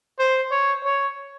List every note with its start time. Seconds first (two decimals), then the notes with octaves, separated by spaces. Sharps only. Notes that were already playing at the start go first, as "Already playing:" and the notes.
0.19 C5
0.51 C#5
0.84 C#5